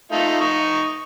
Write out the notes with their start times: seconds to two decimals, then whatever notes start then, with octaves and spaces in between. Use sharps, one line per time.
0.12 A3 D#4 F4
0.41 D#4 C#6